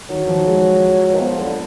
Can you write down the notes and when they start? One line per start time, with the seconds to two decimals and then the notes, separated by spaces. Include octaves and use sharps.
0.09 D#3 F#3
0.23 D#3
0.28 F3
0.46 G#3
1.14 D#3
1.20 F3 B3
1.39 D3